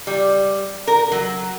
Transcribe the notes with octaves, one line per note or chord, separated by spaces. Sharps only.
G3
A#4
F#3